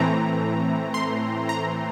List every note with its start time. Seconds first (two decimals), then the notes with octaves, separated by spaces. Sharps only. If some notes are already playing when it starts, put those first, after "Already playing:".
Already playing: A2 E3 A3 C4 A#5
0.94 C6
1.49 A#5